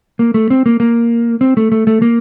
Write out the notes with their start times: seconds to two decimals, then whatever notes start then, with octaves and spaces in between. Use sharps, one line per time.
0.19 A#3
0.34 A3
0.50 C4
0.66 A#3
0.80 A#3
1.41 C4
1.57 A3
1.72 A3
1.87 A3
2.02 A#3